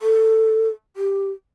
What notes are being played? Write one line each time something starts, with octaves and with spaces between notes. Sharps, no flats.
A4
G4